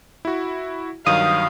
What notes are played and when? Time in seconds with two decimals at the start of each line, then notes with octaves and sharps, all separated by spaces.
0.25 E4 F#4
1.07 G2 D#3 F#3 F5 D#6